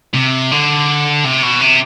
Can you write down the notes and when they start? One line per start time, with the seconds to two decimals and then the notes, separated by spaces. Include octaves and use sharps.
0.14 C3
0.51 D3
1.24 C3
1.43 B2
1.61 C3